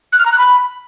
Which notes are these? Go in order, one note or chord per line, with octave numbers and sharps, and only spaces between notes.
F#6
F6
A#5
F#6
B5